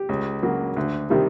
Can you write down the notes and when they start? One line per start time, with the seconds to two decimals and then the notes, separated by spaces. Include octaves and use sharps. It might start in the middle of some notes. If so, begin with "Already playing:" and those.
Already playing: G4
0.09 C#2
0.43 C#3 F#3 A#3
0.76 D2
1.10 C3 D#3 G3